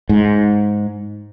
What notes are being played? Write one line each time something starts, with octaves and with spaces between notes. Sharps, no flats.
G#2